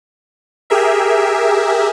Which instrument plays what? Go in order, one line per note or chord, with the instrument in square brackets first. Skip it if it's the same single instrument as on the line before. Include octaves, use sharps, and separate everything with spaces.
[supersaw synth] G4 G#4 A#4 E5